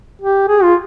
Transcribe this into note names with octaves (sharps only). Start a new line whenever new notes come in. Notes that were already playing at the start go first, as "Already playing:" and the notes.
G4
G#4
F4